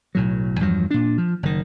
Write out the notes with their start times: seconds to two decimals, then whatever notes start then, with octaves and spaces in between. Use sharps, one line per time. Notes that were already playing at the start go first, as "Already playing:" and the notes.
0.15 B1 A2 F#3
0.60 E2 G2 F3 F#3
0.91 A#2 D4
1.18 F3
1.43 F#1 D#3